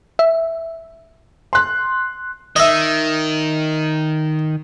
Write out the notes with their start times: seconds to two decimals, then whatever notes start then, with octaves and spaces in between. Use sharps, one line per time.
0.19 E5
1.53 C6 F#6
2.56 D#3 D#5 E5